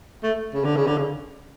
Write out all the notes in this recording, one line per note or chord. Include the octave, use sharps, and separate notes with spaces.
A3
C#3
D3
C#3
D3
C#3